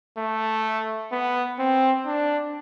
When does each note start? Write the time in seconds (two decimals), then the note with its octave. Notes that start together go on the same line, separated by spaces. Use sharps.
0.18 A3
1.12 B3
1.59 C4
2.05 D4